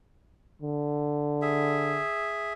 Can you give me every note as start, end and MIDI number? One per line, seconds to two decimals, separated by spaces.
0.62 2.02 50
1.42 2.53 68
1.42 2.53 76